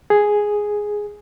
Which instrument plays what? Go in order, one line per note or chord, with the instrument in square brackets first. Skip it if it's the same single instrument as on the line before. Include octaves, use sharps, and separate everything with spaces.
[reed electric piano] G#4